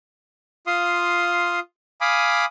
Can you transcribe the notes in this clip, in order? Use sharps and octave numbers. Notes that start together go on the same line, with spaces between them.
F4 F5 C6 D#6
F5 G#5 B5 D6 D#6